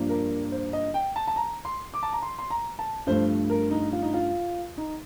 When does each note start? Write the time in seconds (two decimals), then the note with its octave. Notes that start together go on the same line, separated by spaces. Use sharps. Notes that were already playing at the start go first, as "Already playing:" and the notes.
Already playing: G2 F3 A#3 D4
0.09 A#4
0.52 C5
0.73 D#5
0.94 G5
1.16 A5
1.28 A5
1.36 A#5
1.65 C6
1.94 D6
2.03 A5
2.13 A#5
2.22 C6
2.39 C6
2.50 A#5
2.79 A5
3.07 G2 F3 A3 C5
3.50 A#4
3.71 D#4
3.93 F4
4.02 D#4
4.14 F4
4.78 D#4